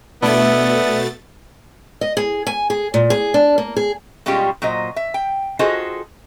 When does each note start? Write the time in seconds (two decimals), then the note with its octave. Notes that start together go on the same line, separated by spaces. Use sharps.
0.22 B2 A3 B3 D4 E4 A6
2.01 D#5
2.17 G#4
2.47 G#5
2.70 G#4
2.94 A#2
3.10 G#4
3.34 D4
3.58 A#3
3.77 G#4
4.26 B2 G3 G#3 C#4 F4 G4
4.62 A#2 F#3 C5 D#5
4.96 E5
5.14 G5
5.59 F4 F#4 G#4 A4 C5 D#5